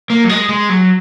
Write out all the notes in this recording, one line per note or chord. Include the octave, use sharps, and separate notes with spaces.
A#3
F#3
G#3
G#3
F#3